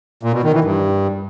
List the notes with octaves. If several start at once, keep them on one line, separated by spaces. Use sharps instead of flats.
A#2
B2
D#3
E3
G2